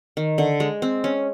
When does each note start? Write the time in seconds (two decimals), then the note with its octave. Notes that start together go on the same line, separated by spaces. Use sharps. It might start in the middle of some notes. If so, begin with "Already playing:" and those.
0.17 D#3
0.38 D3
0.60 G#3
0.82 C4
1.04 C#4